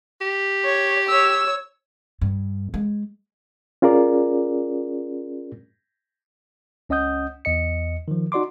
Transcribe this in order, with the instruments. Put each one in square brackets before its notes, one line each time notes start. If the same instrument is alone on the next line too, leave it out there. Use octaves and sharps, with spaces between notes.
[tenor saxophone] G4
[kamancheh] C#5
C#5 E6
[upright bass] G2
G#3
[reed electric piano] C#4 F4 G#4 A#4 D5
[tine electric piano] C#2 C#4 D#5 F#5 D#6 G6
E2 D#5 C#7
D#3 F3
D#4 F#4 D5 C6 D6